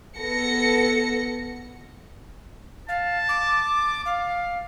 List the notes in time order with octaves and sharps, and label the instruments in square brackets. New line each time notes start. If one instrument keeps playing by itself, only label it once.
[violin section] B3 A4 A#6 C#7
[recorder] F5 [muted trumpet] A5
[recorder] D6
F5